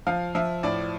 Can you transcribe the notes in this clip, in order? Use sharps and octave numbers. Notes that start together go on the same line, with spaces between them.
F3 F5
F3 E5
A2 D5